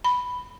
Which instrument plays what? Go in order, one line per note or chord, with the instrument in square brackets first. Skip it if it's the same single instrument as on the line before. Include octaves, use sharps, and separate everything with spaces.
[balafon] B5